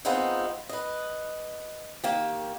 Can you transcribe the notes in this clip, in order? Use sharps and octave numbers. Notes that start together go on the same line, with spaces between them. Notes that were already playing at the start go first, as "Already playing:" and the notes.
D#3 G#3 B3 C4 D#4 F4
B4 D#5
D#3 A#3 G4